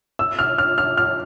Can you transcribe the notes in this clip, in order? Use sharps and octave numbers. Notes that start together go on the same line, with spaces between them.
E6
F6
F6
F6
F6